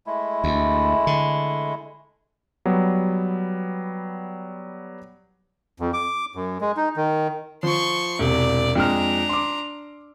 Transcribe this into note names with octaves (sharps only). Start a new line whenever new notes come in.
G#3 A3 E4
D2
D3
F#3 G3 B3
F2
D6
F#2
G#3
D#4
D#3
F3 C6 C#6
E1 C3 D5
F2 G#3 D4 A#5 F6
C6 D6